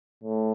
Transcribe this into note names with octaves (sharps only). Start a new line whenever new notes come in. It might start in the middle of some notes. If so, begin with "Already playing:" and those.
A2